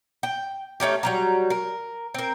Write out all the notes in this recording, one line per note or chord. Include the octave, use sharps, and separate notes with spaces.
G5
A3 C#4 D#4 G4
F#3 G3 A#5
A#4
C4 A#4